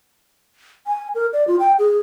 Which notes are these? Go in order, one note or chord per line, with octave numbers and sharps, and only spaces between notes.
G#5
A#4
D5
F4
G5
G#4